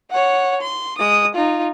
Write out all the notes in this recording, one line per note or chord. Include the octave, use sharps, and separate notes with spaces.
C#5 F#5
C6
G#3 D#6
D#4 F4